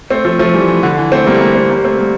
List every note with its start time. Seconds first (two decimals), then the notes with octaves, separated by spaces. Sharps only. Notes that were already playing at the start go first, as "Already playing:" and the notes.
0.11 A3 C4
0.25 F3 A3
0.39 F3 A3
0.54 E3 G3
0.68 E3
0.83 D3
0.98 E3
1.12 A3 C4
1.27 G3 A#3
1.34 A3
1.41 G3 A#3
1.55 A3 C4
1.70 G3 A#3
1.85 A3 C4
1.99 G3 A#3